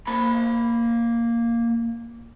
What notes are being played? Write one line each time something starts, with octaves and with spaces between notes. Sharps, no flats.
A#3 B5